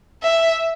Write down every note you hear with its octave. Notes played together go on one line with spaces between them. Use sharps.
E5